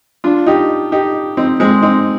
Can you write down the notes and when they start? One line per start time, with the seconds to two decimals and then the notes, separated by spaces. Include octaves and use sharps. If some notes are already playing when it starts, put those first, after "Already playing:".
0.24 D4 F4
0.46 D#4 G4
0.92 D#4 G4
1.37 C4 D#4
1.60 G#3 C4
1.82 C4 D#4